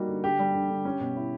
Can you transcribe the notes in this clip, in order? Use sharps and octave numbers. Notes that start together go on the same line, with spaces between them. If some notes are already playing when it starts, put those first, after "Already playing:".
Already playing: G3 A#3 D#4 F#4
D3
D3 G4
G3
D3
D3
C#4
B2
E4